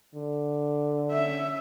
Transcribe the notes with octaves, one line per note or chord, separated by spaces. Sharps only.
D3
C#4 E5